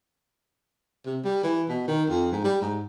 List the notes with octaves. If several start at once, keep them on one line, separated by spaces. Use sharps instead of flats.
C3
G3
E3
B2
D#3
F2
G#2
G3
G#2